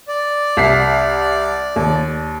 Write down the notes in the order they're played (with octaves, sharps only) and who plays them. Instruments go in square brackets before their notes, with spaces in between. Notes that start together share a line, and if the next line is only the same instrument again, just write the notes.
[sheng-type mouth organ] D5
[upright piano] C2 B6 C7
D#2